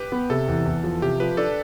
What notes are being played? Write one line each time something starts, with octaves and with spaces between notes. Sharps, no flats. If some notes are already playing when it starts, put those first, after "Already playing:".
Already playing: G4 B4
B3
C3 A4
E2
E2
F3
C3 G4
F3 B4
D4 A4